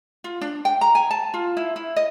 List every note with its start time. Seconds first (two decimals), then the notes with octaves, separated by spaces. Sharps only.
0.24 F4
0.41 D4
0.65 G5
0.81 A#5
0.95 G#5
1.11 A5
1.34 F4
1.57 E4
1.76 E4
1.96 D#5